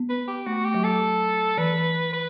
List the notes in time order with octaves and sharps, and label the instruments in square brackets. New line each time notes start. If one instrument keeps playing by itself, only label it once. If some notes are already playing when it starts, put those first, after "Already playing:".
Already playing: [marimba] B3
[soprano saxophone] B4
G4
[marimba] A3 [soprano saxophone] F#4
[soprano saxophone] G4
[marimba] F#3
[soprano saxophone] A4
[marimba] E3 [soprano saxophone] B4
[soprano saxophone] B4